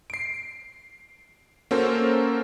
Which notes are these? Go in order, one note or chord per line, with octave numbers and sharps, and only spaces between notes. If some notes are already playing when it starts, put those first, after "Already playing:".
C7 D7
A#3 C#4 F#4 A4 A#4 C5